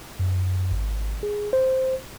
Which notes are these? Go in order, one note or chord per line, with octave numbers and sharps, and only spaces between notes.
F#2
G#1
G#4
C5